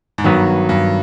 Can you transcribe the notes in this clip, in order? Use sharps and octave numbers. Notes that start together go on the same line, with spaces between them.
G#2
G2 D#3 F#3 B3
G2